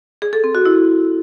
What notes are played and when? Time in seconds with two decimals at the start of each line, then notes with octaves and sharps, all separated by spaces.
0.22 G#4
0.33 A4
0.44 C4
0.55 F#4
0.66 E4